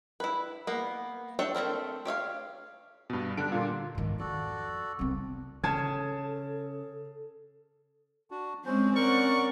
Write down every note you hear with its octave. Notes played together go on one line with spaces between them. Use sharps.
E4 B4
A#3 B3
D4 C#5 E5 G5
A3 A#3 C4 A#4
G4 C#5 E5 F5
G2 B2
D3 G3 D4 D7
A#2 D3 A#3 F4
G#2 D#3
F2 F#4 A4 D5
C2 C4
C#3 A4 A5 G#6
D4 F#4
G#3 C4 C#4 C5
C#4 A#4 D5 F#5 C#6